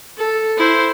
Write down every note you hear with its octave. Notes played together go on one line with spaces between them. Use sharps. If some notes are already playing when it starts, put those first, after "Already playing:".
A4
E4 C5